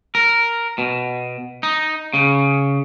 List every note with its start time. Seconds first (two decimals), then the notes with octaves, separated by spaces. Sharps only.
0.15 A#4
0.78 B2
1.63 D#4
2.14 C#3